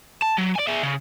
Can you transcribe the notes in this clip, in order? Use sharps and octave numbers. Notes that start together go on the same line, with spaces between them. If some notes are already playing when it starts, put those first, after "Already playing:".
A5
F#3
D5 G#5
G#4 E5
C#3